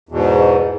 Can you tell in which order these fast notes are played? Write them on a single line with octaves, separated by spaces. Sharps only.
E2 B2 G#2